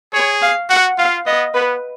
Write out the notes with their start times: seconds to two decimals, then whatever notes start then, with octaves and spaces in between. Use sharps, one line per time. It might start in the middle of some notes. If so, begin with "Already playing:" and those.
0.13 G#4 C#5
0.42 F5
0.69 F#4 F#5
0.98 F4 F5
1.26 B3 D#5
1.54 B3 B4